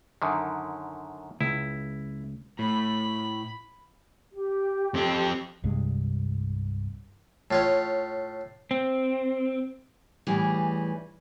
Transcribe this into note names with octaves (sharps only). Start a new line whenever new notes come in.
F#2 D3 D#3
C#2 E4
A2 B5
G4
F2 C4
C2 G2 G#3
A2 F4 C#5
C4
A2 E3 G3 G#4